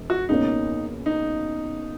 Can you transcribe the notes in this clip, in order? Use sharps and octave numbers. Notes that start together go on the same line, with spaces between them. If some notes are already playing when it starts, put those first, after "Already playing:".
Already playing: E1
F#4
C#2 B2 A#3 C#4 D#4
D#4